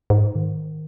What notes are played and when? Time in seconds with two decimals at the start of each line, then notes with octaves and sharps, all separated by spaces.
0.10 G#2
0.35 D#3